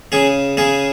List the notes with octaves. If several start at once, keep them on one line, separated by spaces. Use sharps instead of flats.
C#3 G#4
C#3 G#4